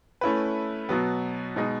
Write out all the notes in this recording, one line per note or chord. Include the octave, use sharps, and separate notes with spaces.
A3 C#4 E4 B4
B2 F#3 B3
B2 G#3 D#4